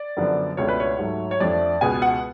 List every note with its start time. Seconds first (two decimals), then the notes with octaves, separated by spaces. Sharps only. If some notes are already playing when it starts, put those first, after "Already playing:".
Already playing: D5
0.17 F#2 D3 F3 B3 D4
0.57 C#2 B2 A3 D4 C#5
0.69 B4
0.80 C#5
0.99 G#2 F#3 A3
1.31 C#5
1.40 F2 F3 A3 D4 D5
1.81 C#2 B2 G#3 B3 G#5
2.02 F#5